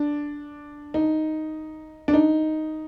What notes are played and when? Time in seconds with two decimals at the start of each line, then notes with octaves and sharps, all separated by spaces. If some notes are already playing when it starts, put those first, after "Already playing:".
Already playing: D4
0.94 D#4
2.08 D4
2.13 D#4